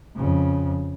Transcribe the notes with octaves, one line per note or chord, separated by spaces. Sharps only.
F2 C#3